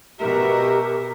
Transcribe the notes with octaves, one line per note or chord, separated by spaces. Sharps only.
B2 G4 A#4 E5